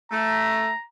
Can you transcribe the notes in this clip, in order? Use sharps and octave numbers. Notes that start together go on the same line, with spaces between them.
A3 A#5